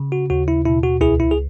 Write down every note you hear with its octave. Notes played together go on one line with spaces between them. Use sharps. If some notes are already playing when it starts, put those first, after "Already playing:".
Already playing: C#3
F#4
D#2 F#4
E4
B2 E4
F#4
C#2 E4 G#4
E4
G#4